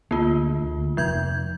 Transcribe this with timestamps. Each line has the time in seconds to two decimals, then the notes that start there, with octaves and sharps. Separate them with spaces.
0.11 D2 A#3 F4
0.62 D2
0.97 F1 F3 G6 G#6